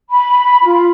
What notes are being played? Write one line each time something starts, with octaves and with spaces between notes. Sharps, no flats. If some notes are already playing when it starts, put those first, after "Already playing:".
B5
F4